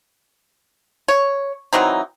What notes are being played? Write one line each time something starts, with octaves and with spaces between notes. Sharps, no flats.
C#5
E3 F#3 C4 D#4